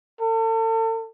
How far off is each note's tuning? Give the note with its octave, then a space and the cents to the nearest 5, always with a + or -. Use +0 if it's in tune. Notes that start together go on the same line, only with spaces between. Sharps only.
A4 +40